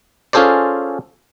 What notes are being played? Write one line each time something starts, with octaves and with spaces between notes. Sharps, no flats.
C#4 F4 G#4 A4 C5 D5